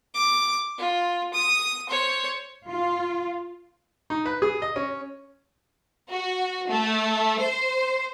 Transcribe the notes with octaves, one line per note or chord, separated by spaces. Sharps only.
D6
F4
D#6
C5 C#5
F4
D#4
B4
G#4
D#5
C#4
F#4
A3
C5